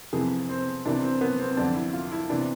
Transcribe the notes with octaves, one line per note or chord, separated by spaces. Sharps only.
F2 C3 E3 G#4
C4
C2 C3 E3 D4
C4
B3
C4
C4
F2 D3 D4
E4
F4
E4
C3 E3 D4